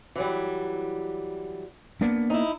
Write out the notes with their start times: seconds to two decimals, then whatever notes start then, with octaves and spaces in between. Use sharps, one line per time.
0.15 E3 F#3 G3
2.01 A#3 B3 D4
2.30 D#4 E4